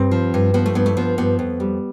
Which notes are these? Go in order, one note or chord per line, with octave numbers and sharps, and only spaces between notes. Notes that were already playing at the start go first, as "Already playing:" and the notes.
Already playing: G2 C4
F3
G2
F3 B3
A3
G2 B3
A3
F3 B3
G2 B3
F2
G3